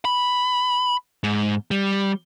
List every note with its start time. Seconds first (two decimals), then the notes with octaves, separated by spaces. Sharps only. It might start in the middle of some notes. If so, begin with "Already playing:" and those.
0.05 B5
1.24 G#2
1.71 G3